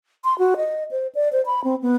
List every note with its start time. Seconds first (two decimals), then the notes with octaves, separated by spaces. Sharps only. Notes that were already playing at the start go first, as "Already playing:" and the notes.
0.24 C6
0.39 F#4
0.57 D#5
0.91 C5
1.15 D5
1.33 C5
1.46 B5
1.64 C4
1.82 B3